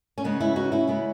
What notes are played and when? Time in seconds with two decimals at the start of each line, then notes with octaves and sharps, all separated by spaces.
0.18 C#4
0.24 C#3 G#3 B3 D#4
0.40 C#4 E4
0.56 D#4 F#4
0.72 C#4 E4
0.88 C#3 G#3 B3